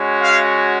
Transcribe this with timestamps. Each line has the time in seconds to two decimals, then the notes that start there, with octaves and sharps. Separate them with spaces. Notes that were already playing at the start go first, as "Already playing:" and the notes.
Already playing: G#3 C#4 F#4
0.21 F5